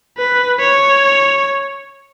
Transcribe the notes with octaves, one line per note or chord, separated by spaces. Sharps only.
B4
C#5